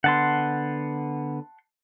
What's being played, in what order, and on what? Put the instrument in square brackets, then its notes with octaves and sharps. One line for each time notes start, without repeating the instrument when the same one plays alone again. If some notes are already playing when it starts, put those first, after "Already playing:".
[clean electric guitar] D3 B3 [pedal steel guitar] F#5 A5 C6